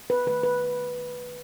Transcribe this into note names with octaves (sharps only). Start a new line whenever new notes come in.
B4
D#3 A3 B4
B4